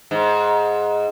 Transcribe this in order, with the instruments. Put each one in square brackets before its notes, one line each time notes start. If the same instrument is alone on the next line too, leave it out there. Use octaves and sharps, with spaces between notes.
[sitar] G#2